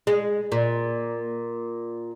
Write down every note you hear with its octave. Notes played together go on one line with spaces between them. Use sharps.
G#3
A#2